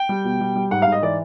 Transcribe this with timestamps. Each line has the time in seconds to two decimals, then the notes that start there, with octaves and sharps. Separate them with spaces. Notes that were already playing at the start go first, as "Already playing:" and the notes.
Already playing: G5
0.09 G3
0.25 B2
0.41 G3
0.56 G3
0.71 G#2 F#5
0.82 F5
0.87 G#2 D#5
1.02 E3 D5